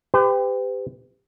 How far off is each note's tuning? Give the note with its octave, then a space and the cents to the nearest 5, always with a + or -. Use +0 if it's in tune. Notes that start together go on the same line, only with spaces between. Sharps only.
G4 +20 B4 +45